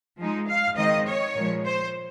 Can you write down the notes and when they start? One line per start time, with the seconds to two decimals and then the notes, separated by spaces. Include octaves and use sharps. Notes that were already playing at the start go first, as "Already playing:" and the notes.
0.18 F3 G#3 D#4
0.47 F5
0.77 D#3 G#3 C4 D#4 D#5
1.06 C#5
1.35 A#2 F3 G#3
1.65 C5